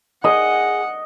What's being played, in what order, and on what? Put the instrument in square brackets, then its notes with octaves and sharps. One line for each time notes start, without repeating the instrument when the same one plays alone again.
[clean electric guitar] G#4 [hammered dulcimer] D#5 [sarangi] F#5